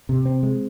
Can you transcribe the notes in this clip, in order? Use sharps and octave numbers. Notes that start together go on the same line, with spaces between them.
C3
C4
G#3